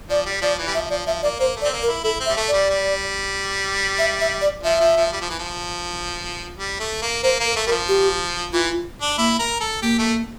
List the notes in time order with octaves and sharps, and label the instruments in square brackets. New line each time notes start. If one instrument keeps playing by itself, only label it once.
[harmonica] F3 [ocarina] D5
[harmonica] G3
[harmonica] F3 [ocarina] D5
[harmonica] E3
G3
[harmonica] F3 [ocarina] E5
[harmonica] F3 [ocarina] D5
[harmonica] F3 [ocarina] E5
[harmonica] A#3 [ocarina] D5
[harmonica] A#3 [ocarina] C5
[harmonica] A3
[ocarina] D5
[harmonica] C4
A#3
[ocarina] A#4
[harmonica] E4
[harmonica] E4 [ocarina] A4
[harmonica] C4
[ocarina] E5
[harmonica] G3
A3
[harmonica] G3 [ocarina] D5
[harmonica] G3
[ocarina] E5
E5
D5
[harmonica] F3 [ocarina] E5
[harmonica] F3
F3
G3
F3
E3
F3
G3
A3
A#3
[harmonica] A#3 [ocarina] C5
[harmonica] A#3
[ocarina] A#4
[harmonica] A3
[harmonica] G3 [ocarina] A#4
[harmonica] F3
[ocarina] G4
[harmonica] E3 [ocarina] F4
[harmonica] D4
[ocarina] A#3 [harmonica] E4
[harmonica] A#4
A4
[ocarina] A#3 [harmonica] G4
[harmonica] A3